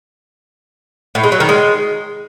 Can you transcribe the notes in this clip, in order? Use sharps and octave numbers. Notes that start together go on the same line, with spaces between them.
A2
G#3
F#3
D#3
G#3